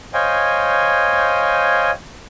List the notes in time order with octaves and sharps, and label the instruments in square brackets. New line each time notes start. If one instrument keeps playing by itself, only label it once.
[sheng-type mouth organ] C5 C#5 D#5 F5 G5 G#5